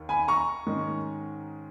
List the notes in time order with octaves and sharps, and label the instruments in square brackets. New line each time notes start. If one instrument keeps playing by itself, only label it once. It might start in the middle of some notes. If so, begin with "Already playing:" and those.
Already playing: [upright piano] D#2 D#3
G#5 B5
A#5 C#6
G#2 D#3 G#3 C#4